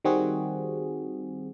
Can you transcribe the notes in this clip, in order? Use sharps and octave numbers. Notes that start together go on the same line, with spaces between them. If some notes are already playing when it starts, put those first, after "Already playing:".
D#3 G3 C4 F#4 G#4